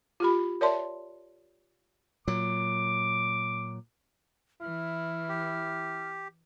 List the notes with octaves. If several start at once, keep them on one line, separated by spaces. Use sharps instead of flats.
F4 G4 B5
A#4 C#5 D5 E5 A5 C6
A#2 F#3 D6
E3 E4 F6
G4